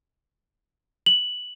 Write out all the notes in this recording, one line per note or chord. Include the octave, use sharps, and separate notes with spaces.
F#7